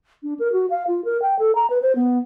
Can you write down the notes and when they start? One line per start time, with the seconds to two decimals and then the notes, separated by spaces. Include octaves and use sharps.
0.23 D4
0.39 A#4
0.52 F#4
0.70 F5
0.88 F4
1.05 A#4
1.22 G5
1.39 A4
1.55 A#5
1.70 B4
1.82 C5
1.96 B3